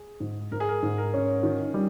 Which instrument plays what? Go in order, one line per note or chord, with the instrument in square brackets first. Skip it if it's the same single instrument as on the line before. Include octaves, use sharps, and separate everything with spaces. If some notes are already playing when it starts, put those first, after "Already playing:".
Already playing: [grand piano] G#4
[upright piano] G#2
[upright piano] G#2 [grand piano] A#4
[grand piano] G#4
A#4
[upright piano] G#2
[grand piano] A#4
[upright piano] C#4
[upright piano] D#3 [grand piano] A#4
[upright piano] G3